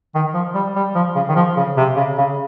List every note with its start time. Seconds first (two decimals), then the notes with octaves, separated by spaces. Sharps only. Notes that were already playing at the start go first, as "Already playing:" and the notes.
0.15 D#3
0.34 F3
0.55 G3
0.76 G3
0.95 F3
1.16 C#3
1.29 D#3
1.36 F3
1.57 C#3
1.77 C3
1.97 C#3
2.18 C#3